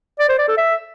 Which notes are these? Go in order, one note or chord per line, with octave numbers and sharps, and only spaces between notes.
D5
C5
D5
A4
E5